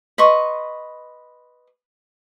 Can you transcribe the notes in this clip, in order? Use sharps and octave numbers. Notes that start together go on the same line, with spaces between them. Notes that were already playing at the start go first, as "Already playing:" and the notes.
B4 D#5 C6 C#6